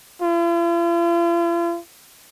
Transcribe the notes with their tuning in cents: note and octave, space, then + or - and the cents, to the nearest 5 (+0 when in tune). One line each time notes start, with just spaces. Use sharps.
F4 -45